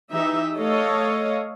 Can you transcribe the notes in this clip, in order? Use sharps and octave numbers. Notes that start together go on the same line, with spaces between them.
E3 D#4 G4 E5
A3 A4 C#5 D#5 F5